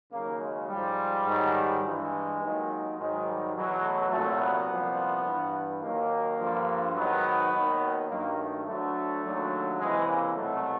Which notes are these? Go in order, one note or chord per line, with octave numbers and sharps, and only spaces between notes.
D#2 C#3 F#3 A#3
G#3
G#2 F3 G3
G#2 D#3 F#3
G2 E3 G#3
D#2 D#3 F#3
G#2 D#3 F#3 G#3
G3
E2 B2 F#3
A3
C2 A#2 F#3 A3
B3
C2 A#2 F3
G2 E3
D#2 D#3 F#3 A#3
G2 D3 F3
G#2 D#3 F#3 B3
D#2 D#3 F#3
G2 D#3 F#3 A#3
A3
D2 D3 F#3 A3
D#2 D3 F#3
C#2 C3 E3 G#3
A#3
C2 B2 F#3 A3